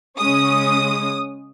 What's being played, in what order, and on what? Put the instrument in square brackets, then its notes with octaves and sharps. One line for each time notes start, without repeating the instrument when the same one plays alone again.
[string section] C#3 G#3 C#4 D#6